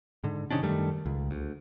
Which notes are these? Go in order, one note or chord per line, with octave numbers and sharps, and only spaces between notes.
G#2 D3
C3 D#3 C#4 D4
F#2 D#3 G3 A3
C#2
D2